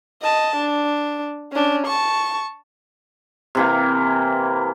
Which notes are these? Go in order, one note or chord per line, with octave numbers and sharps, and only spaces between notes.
D#5 A5
D4
C#4 D4
A5 C#6
C3 E3 A#3